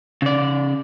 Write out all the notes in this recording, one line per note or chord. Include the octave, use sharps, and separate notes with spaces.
C#3 D5